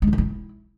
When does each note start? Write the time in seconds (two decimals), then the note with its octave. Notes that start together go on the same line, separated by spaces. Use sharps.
0.02 G#3
0.07 D4
0.13 E3
0.18 E4